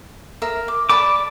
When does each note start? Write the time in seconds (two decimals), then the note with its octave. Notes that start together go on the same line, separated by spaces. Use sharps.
0.42 A#4 E5
0.68 D6
0.89 D5 A5 B5 D6